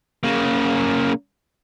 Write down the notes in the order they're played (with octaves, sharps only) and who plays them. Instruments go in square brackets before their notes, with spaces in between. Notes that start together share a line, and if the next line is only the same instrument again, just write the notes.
[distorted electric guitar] C#3 A#3